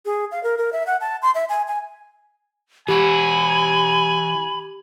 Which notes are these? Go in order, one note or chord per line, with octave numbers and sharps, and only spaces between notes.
G#4
F5
A#4
A#4
E5
F#5
A5
C6
E5
G#5
G#5
E3 F#4 G4 G#5 B5